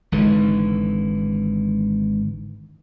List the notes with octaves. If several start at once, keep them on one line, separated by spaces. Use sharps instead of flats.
G#1 G#2 D3 E3